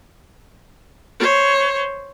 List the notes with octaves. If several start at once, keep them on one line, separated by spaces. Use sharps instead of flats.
C5 C#5